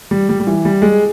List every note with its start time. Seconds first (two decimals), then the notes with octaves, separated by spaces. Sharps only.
0.11 G3
0.29 G3
0.40 G3
0.47 E3
0.65 G3
0.82 G#3